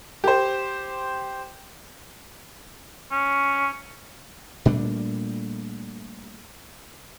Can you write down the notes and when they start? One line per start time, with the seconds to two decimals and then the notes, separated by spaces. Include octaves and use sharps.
0.24 G4 C5
3.11 C#4
4.65 A#2 G3 A3 D4